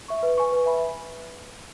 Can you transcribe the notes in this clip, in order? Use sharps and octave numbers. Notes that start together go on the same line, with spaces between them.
E5 C#6
B4
G#5 C#6
B4
E5 G#5 B5